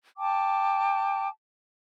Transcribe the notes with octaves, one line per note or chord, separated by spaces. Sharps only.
G5 A5 D6